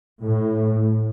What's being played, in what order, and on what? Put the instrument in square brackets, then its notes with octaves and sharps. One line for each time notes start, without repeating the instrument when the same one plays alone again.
[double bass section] A2